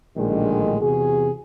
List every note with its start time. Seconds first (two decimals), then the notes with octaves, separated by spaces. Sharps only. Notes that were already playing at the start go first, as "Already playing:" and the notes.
0.17 A#1 A2 D3 D#3 G3 G#3
0.81 E2 C3 F#4 G#4